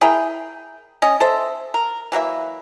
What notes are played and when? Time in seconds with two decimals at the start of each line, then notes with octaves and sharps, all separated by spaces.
0.01 E4 G#4 A#4 G5
1.02 C#4 D#5
1.20 A4 C5 E5
1.74 A#4
2.12 E3 F#3 A#3 E5